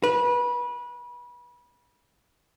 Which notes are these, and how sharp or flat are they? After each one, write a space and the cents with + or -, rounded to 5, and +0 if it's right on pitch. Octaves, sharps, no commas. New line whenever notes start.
B4 -25